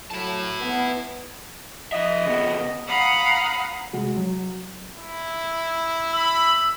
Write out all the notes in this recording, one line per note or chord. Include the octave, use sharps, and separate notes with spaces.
A2 F#3 E4 A5
B3 B4
F3 D#5 E5
C#3 B3
F5 F#5 A#5 B5 D#6
C3 G#3 F#4
F#3
E4
B5 E6